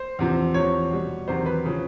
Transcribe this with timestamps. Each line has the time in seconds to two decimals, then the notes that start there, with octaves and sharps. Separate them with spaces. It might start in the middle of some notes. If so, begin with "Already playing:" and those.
Already playing: C5
0.19 E2 C3 F3
0.54 E2 C3 F3 C#5
0.91 B2 G3
1.28 E2 C3 D#3 F#3 C5
1.46 B4
1.66 C#3 F3